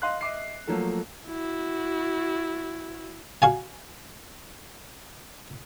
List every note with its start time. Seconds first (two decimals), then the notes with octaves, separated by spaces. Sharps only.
0.02 D#5 F5 C6 F#6
0.21 D#5 E5 D6 C7
0.67 F3 F#3 A3 A#3 A4
1.28 E4 F#4
3.42 F#4 F5 G#5